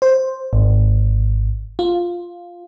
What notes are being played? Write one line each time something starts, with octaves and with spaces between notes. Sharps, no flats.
C5
G#1
F4